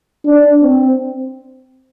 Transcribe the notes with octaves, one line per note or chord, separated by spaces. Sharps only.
D4
C4